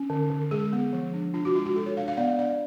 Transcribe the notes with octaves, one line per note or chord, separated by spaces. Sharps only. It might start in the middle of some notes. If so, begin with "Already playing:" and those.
Already playing: C#4
D3
D3
G#3 G#4
B3
F3
D4
D4 F4
F#4
G#3 F4
F#4
G#3 A4
C#5
D4 F5
F5
B3 D5
D4 D5